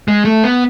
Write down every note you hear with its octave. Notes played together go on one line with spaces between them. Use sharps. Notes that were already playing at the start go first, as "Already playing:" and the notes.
G#3
A3
B3